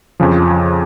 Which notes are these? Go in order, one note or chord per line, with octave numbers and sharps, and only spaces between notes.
F2 C#3 F3